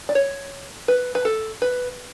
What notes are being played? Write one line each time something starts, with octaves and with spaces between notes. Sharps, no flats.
D5
C#5
B4
B4
A4
B4